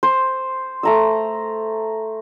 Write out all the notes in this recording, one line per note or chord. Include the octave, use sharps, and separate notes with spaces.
C5
A3 A#5 E6